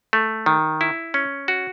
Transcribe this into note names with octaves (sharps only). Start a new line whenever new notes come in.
A3
D#3
E4
C#4
F#4